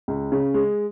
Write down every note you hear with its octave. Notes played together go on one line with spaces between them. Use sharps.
C#2
C#3
G#3